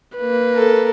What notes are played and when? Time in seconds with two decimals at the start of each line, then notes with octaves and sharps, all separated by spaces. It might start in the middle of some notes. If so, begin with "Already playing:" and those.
0.17 A#3 B4
0.55 A4 A#4